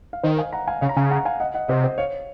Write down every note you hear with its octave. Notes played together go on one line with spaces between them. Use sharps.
F5
D#3 C5 D#5
F5 G#5
F#5 A#5
F5 G#5
C#3 C#5 F5
A#5
C#3 F5 G#5
F#5 A#5
F5 G#5
D#5 F#5
D#5 F#5
C3 C5 D#5
C5
C#5 F5